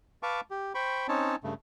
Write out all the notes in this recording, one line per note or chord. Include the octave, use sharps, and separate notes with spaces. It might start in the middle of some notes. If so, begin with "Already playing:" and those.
B4 F5 A5 C#6 D6
G4
C5 G5 B5 C#6
C4 C#4 D#4 C#5 A5
G2 C#3 A3